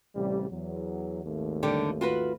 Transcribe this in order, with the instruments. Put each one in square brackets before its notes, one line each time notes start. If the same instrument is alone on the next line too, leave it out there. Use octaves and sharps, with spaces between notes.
[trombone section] A1 C3 G3
E2 F#3
G#1 D#2 A3
[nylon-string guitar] D3 G3 G4
F4 F#4 B4